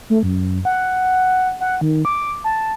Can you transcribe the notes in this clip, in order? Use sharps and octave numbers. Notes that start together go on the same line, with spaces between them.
A3
F#2
F#5
F#5
D#3
D6
A5